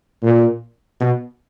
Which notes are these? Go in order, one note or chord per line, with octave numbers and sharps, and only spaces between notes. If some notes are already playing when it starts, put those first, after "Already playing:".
A#2
B2